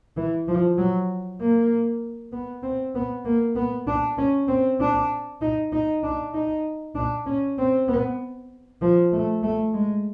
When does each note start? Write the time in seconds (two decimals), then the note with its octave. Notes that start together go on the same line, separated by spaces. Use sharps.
0.17 E3
0.48 F3
0.78 F#3
1.41 A#3
2.32 B3
2.63 C4
2.95 B3
3.25 A#3
3.56 B3
3.87 D4
4.18 C#4
4.48 C4
4.80 D4
5.42 D#4
5.72 D#4
6.03 D4
6.33 D#4
6.95 D4
7.26 C#4
7.58 C4
7.89 B3
8.82 F3
9.12 A3
9.43 A3
9.74 G#3